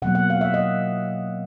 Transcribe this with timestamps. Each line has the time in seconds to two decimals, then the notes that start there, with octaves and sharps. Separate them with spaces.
0.02 B2 F#3 A#3 F#5
0.15 F#5
0.30 F5
0.41 E5
0.54 D#5